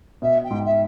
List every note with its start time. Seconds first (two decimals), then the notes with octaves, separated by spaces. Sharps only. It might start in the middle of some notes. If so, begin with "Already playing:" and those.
0.22 B2 E5
0.43 G5
0.50 G#2
0.65 E5